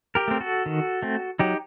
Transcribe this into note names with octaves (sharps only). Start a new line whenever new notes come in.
G4 A#4
A3 C4
F#4 A4
D#3
A3 C4
F#3 D#4 G4